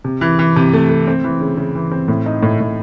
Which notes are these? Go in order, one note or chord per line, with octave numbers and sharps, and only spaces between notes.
C3
E3
E3
C3
A3
A3
C4
E3
C#3
C#3
E3
C4
A2
D#4
A2
A2